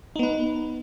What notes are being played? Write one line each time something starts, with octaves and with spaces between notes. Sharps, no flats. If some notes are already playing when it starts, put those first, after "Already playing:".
B3 D#4 B4